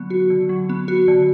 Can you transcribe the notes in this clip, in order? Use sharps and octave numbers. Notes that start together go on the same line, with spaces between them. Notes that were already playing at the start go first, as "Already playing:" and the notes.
Already playing: D3 F#3 B3
F#4
D3
F#3
B3
F#4
D3